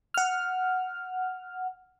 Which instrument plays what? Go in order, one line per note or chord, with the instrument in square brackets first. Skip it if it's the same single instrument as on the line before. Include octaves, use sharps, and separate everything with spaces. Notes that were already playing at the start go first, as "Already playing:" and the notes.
[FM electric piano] F#5 F6